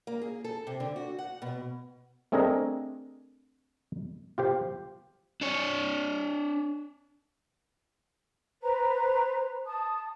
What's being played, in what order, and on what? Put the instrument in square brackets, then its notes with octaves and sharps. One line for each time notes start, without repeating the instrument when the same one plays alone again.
[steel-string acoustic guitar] A#3
G#4
A4
C3
D3
F#4
F#5
B2
[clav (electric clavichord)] A3 C4 D4 G#4 A#4 D#5
F4 G4 C5
[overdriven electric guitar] D4 C#5
[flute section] B4 C5 A#5
A5 D#6